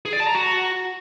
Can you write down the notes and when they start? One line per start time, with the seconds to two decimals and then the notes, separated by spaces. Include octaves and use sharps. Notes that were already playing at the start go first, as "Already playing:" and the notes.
0.05 G#4
0.13 D5
0.20 A5
0.27 A#5
0.35 F#4